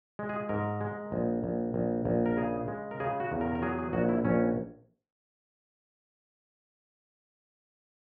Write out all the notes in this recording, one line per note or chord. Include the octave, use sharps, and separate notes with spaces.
G#3
G#4
G#2 A#4
G#3
A#1
A#1
A#1
A#1
A#4
C#3 G#4
G#3
A#4
C#3 G#4
F#4
E2
A#4
A#4
F#3 G#4
G#4
A#1 F#4
E4
A#1 C#4